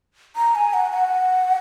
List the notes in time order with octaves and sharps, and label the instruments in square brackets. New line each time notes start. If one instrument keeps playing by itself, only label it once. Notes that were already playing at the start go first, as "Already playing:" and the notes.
[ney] A#5
G#5
F#5
F#5